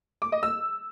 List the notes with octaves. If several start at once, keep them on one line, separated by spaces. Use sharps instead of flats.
D6
D#5
E6